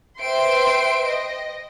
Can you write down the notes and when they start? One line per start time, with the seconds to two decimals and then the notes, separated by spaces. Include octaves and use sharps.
0.20 B4 C5 E5 G5 C6 D7
1.07 D#5